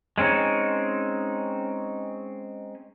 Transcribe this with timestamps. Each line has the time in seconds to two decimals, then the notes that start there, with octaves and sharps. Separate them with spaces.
0.18 G#3 C4 C#4 D#4